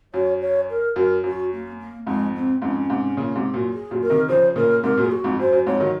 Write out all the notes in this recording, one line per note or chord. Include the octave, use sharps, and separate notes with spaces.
F#2 C#5
C#5
A#4
F#2 A#4
F#2 F#4
A#3
A#3
F2 G#2 G#3
C4
F2 G#2 C#4
G#2 C3
A#2 C#3
G#2 C3
F#2 A#2
G#4
F#2 A#2
A#4
C3 D#3
C#3 F3 C5
A#2 C#3 A#4
G#2 C3 A#4
F#2 A#2
G#4
F#4
F2 G#2
F#2 C5
F#2
F2 G#2 C#5
D#3 F#3